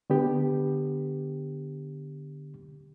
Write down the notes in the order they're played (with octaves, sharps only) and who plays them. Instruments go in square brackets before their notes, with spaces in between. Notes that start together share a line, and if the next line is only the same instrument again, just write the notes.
[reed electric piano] D3 B3 G4